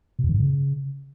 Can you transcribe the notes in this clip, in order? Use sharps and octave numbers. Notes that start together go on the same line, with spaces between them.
B2
F2
D#3
G#2
C#3